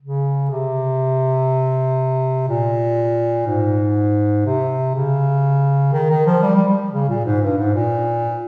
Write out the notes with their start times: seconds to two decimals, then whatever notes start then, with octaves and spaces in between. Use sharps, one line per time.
0.02 C#3
0.50 C3
2.48 A#2
3.47 G#2
4.45 C3
4.95 C#3
5.93 D#3
6.10 D#3
6.26 F3
6.42 G3
6.56 G3
6.67 G3
6.92 C#3
7.08 A#2
7.25 G#2
7.42 G2
7.58 G#2
7.74 A#2